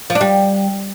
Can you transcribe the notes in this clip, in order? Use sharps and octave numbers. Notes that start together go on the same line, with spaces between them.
F3
D4
G3